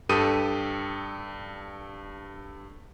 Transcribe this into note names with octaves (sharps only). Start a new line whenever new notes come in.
G2 G4 A4 D#6 D#7